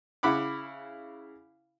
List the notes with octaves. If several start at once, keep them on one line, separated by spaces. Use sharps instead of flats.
C#3 E4 F#5 B5 D6